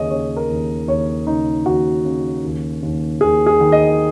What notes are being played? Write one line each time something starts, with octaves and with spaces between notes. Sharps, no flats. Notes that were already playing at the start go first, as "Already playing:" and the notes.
Already playing: D#2 C#3 G#4 C#5 D#5
C#3 C#5
A#4
D#2
D#2 C#5
C#3 D#4
D#2 F#4
C#3
D#2
D#2
D#2 G#4
G#4
D#3
D#5